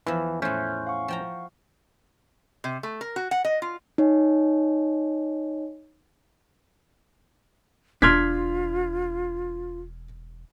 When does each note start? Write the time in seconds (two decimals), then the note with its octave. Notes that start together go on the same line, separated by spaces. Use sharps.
0.07 E2 E3 F3
0.42 A2 A3 C#4 C5 F#6 G6
0.87 F5 F#5 C#6
1.08 F3 G5 A#5
2.64 C3
2.83 A3
3.01 A#4
3.16 F#4
3.31 F#5
3.45 D#5
3.62 F4
3.98 D#4 C#5 D#5 G#5
8.02 E1 D4 F4 C6 F6 G#6 B6